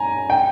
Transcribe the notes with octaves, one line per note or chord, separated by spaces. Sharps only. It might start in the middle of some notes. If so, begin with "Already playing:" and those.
Already playing: G#5 A#5
G5